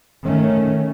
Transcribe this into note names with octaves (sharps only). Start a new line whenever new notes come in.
D#3 A3 C#4